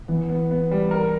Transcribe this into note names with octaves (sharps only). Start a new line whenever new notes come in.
E3 B3
B3
B3
G3
A#4